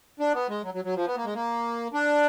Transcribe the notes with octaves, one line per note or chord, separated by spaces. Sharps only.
D4
B3
G#3
F#3
F#3
F#3
F3
B3
A#3
G#3
A#3
D4